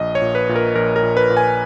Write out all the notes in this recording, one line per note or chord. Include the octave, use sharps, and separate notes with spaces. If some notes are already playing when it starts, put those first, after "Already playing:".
Already playing: A#1 D#5
C#5
A#2
B4
A#2
A#4
A#1 A#4
A#4
A#2
B4
A#2
G#5